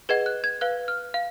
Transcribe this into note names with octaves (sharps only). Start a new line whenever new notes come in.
G#4 B4 D#5 F#5 G#6
F#6
G#6
B4 F5 F#6
F6
F5